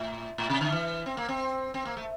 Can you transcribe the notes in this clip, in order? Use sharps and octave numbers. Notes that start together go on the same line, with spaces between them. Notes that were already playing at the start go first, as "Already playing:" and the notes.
Already playing: A2
A2
C3
D3
E3
C4
A#3
C4
C4
A#3
A3